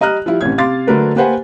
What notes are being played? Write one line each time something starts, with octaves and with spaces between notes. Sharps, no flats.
G3 D#5 A#5 F6 F#6
F3 G3 E4
A1 C3 C#4 G#6
C3 F5 C6 D6 A6
D3 F#3 A3 D4 A#4 B4
A#3 G4 B4 C5 F#5 G#5